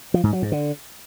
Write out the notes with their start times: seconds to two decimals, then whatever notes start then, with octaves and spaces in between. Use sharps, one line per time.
0.14 F3
0.23 G#2
0.33 F#3
0.42 G#2
0.52 D3